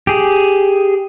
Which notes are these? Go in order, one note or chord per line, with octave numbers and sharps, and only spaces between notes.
G4 G#4